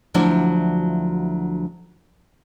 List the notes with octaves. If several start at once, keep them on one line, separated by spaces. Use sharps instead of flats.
D2 F3 F#3 D4 E4